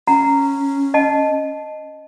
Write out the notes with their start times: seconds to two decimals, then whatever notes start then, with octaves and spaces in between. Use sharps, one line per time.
0.07 C#4 F#5 A#5
0.94 D#5 F#5 A5